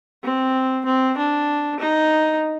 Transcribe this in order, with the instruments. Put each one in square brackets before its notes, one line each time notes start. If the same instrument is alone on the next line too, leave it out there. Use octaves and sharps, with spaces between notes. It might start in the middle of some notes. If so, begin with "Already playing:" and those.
[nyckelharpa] C4
C4
D4
D#4